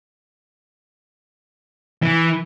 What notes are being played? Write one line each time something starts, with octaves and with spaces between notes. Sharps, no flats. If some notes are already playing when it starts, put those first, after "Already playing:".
E3